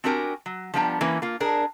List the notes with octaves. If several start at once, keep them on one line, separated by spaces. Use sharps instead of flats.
C4 D4 F#4 G4 A#4 G#5
F#3
F3 G3 B3 D4 G5 A#5
E3 A#3 C#4 A#4 B4
A#3 F4
D4 G#4 A#4